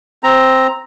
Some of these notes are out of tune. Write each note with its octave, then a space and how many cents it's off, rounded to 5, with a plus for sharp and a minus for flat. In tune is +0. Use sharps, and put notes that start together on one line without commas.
C4 +0 A#5 +0